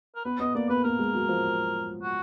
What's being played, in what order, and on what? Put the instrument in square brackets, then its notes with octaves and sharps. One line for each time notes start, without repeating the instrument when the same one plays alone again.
[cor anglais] A#4
[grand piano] B3 [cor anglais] B4
[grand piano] B3 [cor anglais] D#5
[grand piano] A#3 [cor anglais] D5
[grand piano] B3 [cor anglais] B4
[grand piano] A#3 [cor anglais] A#4
[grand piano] G#3
F#3
F3
[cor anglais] F#4